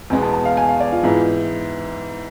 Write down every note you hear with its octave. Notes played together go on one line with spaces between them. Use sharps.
E2 B2 G#3 B3 G#5
A5
A5
F5
G#5
F5
D5
F4
G#2 E3 B3 E4